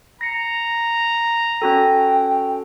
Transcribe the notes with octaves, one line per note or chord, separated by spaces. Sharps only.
A#5 A#6 C7 C#7
C#4 F#4 A4 G5